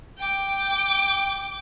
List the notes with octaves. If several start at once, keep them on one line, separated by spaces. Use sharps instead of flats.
G5 D6